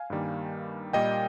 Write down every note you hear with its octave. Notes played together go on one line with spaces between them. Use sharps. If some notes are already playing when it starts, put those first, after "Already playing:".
Already playing: F5 G#5
G2 D#3 G3 A#3
A#2 G3 A#3 D#5 G5